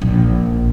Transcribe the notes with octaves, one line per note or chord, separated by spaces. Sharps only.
A#1